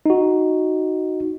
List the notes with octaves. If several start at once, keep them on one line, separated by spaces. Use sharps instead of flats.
D#4 F#4